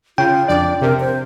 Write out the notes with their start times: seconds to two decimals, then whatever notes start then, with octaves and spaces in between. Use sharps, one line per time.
0.18 C#3 F4 G5
0.48 F2 D4 D5
0.81 C3 A#4
1.00 C5